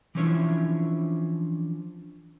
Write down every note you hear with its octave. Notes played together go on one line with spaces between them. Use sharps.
E3 F3 C#4 D4 C#5 E5